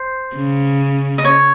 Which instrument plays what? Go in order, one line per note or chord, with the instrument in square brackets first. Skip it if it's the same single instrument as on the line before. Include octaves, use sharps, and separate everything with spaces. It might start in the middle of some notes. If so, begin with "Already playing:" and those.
Already playing: [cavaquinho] C5
[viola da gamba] C#3
[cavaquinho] D#5
C#5